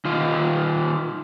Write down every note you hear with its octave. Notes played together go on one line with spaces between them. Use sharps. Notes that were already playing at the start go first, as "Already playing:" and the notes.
D#3 F4